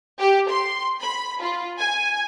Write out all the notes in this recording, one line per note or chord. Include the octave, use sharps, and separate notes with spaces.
G4
C6
B5
F4
G#5